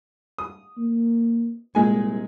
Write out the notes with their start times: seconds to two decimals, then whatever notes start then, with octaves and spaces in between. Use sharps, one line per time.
0.38 D#6
0.78 A#3
1.75 C2 A#2 G#3 G#5